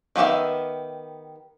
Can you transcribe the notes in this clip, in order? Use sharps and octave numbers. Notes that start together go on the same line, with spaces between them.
D#3 B3 G4 E5 F5